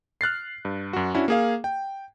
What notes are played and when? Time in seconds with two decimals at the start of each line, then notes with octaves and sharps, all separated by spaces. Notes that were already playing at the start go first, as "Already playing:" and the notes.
0.21 F6 F#6 A6 C7
0.65 G2
0.93 F#2 F#4
1.14 C#4 D4 E4 F#4
1.28 A#3 G#4 F5
1.64 G5